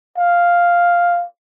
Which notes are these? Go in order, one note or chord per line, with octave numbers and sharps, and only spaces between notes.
F5